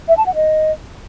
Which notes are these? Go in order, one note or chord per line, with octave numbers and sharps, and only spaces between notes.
E5
A5
F#5
D#5